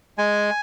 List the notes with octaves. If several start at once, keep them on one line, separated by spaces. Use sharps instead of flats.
G#3 G#5